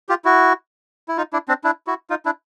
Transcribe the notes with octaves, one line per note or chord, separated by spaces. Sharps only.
F4 G4
E4 F#4
E4
D#4 F4
D4 E4
C4 D4
D4 E4
E4 F#4
D#4 F4
D4 E4